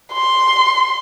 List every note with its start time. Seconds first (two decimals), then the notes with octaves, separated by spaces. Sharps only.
0.13 C6